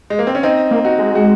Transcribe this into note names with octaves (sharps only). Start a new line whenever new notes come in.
G#3
A#3
C4
C#4
C4 D#4
A#3
D#4 F#4
G#3
F#4